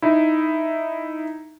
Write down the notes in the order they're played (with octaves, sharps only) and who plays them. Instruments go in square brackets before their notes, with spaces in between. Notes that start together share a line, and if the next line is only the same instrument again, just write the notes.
[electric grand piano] D#4 E4